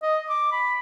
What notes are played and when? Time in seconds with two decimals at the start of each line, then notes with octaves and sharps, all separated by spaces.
0.02 D#5
0.29 D6
0.52 B5